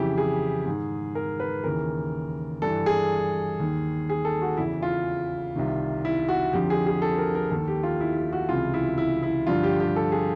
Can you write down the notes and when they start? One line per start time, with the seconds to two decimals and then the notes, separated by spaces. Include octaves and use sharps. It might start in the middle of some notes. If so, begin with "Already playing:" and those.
Already playing: F2 C#3 E3 E4 G4
0.18 G#4
0.66 G#2 D#3
1.15 A#4
1.40 B4
1.64 D#2 C#3 E3 A#4
2.62 G2 E3 A4
2.86 G#4
3.60 D#2 D#3
4.09 G#4
4.25 A4
4.42 F#4
4.57 E2 C#3 E3 E4
4.82 F4
5.56 C2 C3 D#3
6.05 E4
6.29 F#4
6.53 F2 D3 F3 G4
6.70 G#4
6.87 G#4
7.02 A4
7.18 A#4
7.35 A#4
7.51 D#2 D#3 A4
7.68 G4
7.83 F4
8.01 E4
8.16 E4
8.33 F#4
8.49 C#2 C3 E3 F4
8.74 E4
8.98 E4
9.23 E4
9.47 G2 D3 F3 F4
9.63 G4
9.80 G4
9.96 A4
10.12 G#4